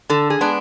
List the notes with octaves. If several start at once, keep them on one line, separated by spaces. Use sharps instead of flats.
D3 A4
G#4
G#3 B3 D4